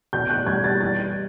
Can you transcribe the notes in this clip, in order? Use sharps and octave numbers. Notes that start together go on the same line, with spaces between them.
B2 G6
F#6
G3 G#6
A6
E3 A6